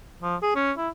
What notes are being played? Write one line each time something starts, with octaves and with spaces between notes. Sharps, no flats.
F3
G#4
C#4
E4